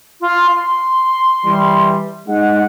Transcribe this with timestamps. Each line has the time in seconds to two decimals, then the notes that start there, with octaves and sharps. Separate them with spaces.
0.21 F4
0.55 C6
1.46 E3 G3
2.28 G#3 D#4 F#5